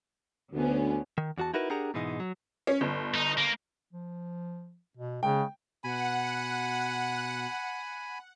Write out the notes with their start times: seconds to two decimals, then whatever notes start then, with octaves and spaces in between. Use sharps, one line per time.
0.54 D2 D3 B3 C#4
1.18 D#3
1.38 E2 F#4 A5
1.54 D#4 E4 F#4 A#4 B4
1.70 D4 G4 G#4 A#4 F#5 A#5
1.94 G#2 B2 E3 G#3 D#4
2.20 F#3
2.67 C#4
2.81 G1
3.15 D#4
3.37 A#3
3.93 F3
4.97 B2
5.23 C#3 G#3 G5
5.84 B2 F#5 G#5 B5